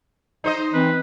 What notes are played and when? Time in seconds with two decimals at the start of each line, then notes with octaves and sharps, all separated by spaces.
0.44 D#4 C5 D#5
0.73 E3 C4 B4